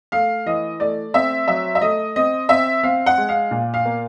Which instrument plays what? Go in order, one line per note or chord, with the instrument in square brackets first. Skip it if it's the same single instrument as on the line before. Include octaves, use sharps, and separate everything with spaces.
[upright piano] A3 F5
E3 D#5
A3 D5
C4 E5
F#3 E5
E5
A3 D#5
C4 D#5
C4 E5
C4 F5
F#5
G#3
F5
A#2
F5
A#3